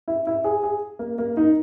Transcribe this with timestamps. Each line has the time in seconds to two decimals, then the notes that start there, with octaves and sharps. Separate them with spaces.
0.08 E4
0.27 E4
0.44 G#4
0.63 G#4
0.99 A#3
1.18 A#3
1.37 D#4